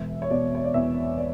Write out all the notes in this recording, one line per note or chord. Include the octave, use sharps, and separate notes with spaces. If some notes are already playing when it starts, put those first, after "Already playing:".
Already playing: E1 E5
C#5
B2 D5
C#5
D5
E2 E5
D5